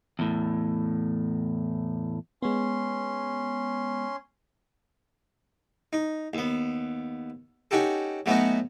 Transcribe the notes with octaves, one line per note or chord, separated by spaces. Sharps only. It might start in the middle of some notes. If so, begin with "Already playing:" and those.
E2 A2
G#3 B3 C#4 C6
D#4
D#2 B3
C#4 D#4 F#4 G4 A4
F#3 A3 B3 C#4 D#4 F#4